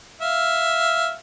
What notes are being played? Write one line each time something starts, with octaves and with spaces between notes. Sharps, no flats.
E5 F5